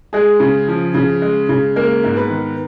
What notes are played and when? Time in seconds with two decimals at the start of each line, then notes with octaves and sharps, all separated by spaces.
0.13 G#3 G#4
0.40 C#3
0.68 F3
0.95 C#3
1.22 G#3
1.49 C#3
1.76 G#3 A#3 A#4
2.04 G#2
2.17 B3 B4
2.30 D#3